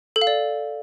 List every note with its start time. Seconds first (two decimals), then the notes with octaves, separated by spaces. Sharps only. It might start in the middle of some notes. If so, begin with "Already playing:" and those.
0.16 A4
0.21 F5
0.27 D5